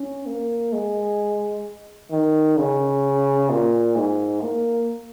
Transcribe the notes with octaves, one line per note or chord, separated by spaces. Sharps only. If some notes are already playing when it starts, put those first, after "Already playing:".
Already playing: C#4
A#3
G#3
D#3
C#3
A#2
G#2
A#3